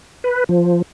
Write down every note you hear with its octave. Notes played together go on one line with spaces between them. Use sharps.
B4
F3